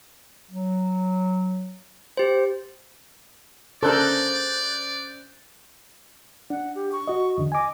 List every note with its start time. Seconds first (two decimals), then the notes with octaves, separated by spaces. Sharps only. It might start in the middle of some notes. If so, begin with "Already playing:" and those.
0.51 F#3
2.17 G4 C5
3.83 C#3 D4 A4 A#4 C5 D5 F#6 G6
6.50 D4 F#5
6.75 G4
6.92 C#6
7.07 F#4 D#5
7.38 E2 D3
7.52 D#5 G#5 D6